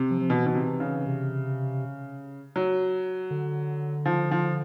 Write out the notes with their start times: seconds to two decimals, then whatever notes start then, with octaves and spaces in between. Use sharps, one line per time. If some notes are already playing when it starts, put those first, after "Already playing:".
Already playing: C3
0.11 F3
0.21 F3
0.29 B2 E3
0.46 B2
0.55 C3
0.80 C#3
1.06 C3
2.56 F#3
3.31 D3
4.06 F3
4.31 F3